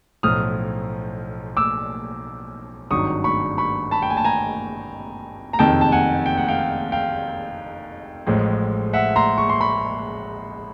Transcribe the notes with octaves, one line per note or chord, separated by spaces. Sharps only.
B1 A2 F3 D#6 F6
D6 E6
G#1 G2 D#3 F#3 C#6 D#6
B5 C#6
B5 C#6
A5 B5
G5
G#5
A5
G#5 A#5
A#5
F#1 F2 C3 D#3 G5 A5
A5
F#5 G#5
G5
F#5
F5 G5
F5 G5
A1 A2 F3 G#3
E5 F#5
A#5 C6
C#6
C6
B5 C#6